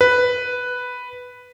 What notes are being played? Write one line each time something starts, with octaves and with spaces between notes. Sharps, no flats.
B4